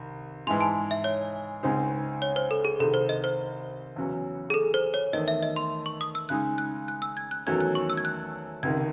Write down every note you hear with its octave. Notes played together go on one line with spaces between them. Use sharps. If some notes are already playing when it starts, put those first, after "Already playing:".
Already playing: C2 D#3
G#2 E3 G#3 C6
A5
E5
C#5
C#2 C#3 G#3 C4 D#4
C#5
C5
A4
G#4
C2 C3 D#3 A4
C5
D#5
C5
E2 C#3 F#3 C#4
G#4
A4
C5
C#5
E2 D#3 A3 D#5
E5
D#5
C6
C#6
D#6
E6
C#3 G#3 D#4 F#6
F#6
F#6
E6
G#6
F#6
E2 D#3 F#3 A3 C#4 G#6
F#6
C#6
E6
G#6
F#6
C#2 C3 D#3 G#6